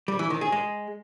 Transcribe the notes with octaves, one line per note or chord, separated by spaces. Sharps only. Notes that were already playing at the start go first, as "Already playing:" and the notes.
G3
E3
D#3
G#4
G#3